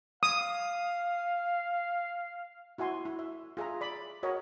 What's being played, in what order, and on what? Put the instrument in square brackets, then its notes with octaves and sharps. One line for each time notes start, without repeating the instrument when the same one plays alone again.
[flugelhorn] F5 [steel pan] D#6
[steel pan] E4 F#4 E5 G#5 C6
E4
E5
F4 G#4 E5 A#5
D5 B5
F#4 A#4 C#5 D#5